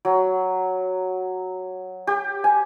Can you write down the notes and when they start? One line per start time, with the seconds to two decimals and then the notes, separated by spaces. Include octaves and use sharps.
0.05 F#3
2.07 G4
2.44 G#5